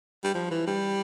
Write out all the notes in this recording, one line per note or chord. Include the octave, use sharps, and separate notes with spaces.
G3
F3
E3
G3